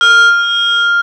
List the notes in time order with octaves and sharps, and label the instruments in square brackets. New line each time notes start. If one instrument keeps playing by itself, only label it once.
[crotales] F6